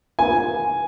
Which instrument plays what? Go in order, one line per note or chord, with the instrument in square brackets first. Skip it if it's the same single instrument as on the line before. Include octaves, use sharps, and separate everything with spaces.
[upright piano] G#5